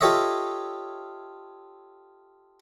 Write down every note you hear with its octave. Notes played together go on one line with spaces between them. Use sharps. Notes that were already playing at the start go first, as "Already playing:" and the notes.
F4 G4 A4 C#5 D#5 E5